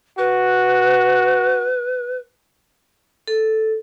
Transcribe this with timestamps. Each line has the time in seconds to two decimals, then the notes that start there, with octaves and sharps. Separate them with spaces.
0.18 F#4 B4
3.27 A4